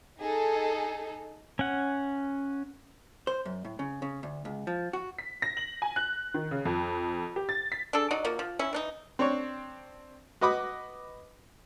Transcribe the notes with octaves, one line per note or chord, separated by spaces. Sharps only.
D#4 G#4 A4
C#4 F#5
C5
F#2
A2
C#3
C#3
D2
C#2
F3
F#4
B6
A#6
F#7
G#5
F#6
D#3
C#3
F2
G4
A6
B6
D4 G#4 A4
F#3 D#4 D5
F3 F#3 A#3
F3
C#4 E4
E3 D4 D#4
C4 D4 C#5
F#4 B4 D#5 B5 D6 D#6